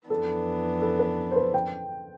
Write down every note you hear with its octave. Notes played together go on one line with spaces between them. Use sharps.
F2 E3 B3 D4 A4
A4
B4
C5
B4
G5